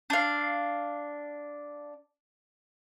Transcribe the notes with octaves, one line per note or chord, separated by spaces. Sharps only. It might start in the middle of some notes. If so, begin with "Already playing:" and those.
D4 F5